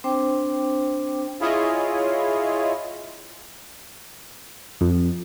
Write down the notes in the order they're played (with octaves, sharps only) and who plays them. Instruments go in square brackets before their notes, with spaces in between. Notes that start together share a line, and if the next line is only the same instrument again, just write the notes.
[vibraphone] C4 D4 C5 G5 D6
[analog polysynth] E4 F4 G#4 C#5 D#5
[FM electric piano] F2